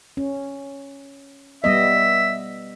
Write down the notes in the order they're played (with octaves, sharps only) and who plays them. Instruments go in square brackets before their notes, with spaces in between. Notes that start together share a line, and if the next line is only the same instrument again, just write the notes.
[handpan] C#4
[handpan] G3 B3 D#5 [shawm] E5